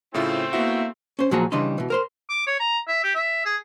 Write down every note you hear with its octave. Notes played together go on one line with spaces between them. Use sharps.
A2 C#3 A3 C4 E4 F4
A#3 B3 E4 F#4
C#4 C5
A#2 F3 F#3 F#4 G#4 A#5
C#3 E3 G3 D4 D#5 C6
B2 E3
A#4 C5 C6
D6
C#5
A#5
E5
G4
E5
G#4